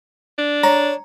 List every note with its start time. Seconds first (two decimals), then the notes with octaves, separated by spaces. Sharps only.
0.38 D4
0.63 C#5 A#5